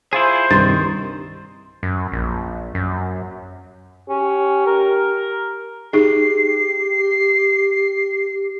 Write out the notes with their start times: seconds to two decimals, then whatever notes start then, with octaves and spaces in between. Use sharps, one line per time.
0.13 E4 F4 G#4 C5
0.51 C2 G2 D#3 C6 A6
1.83 F#2
2.12 A#1
2.75 F#2
4.09 C#4 G4
4.66 A#4
5.93 D#4 G4 G#4 C7